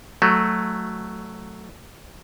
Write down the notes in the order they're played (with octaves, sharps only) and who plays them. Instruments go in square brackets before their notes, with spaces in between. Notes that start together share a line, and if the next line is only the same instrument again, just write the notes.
[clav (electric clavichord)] F#3 A3